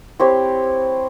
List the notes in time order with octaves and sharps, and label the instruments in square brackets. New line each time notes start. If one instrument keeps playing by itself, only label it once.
[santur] C4 E4 G4 C#5